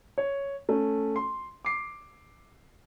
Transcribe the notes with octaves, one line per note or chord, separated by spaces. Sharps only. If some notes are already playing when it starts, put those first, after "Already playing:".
C#5
A3 C#4
C6
D6 C7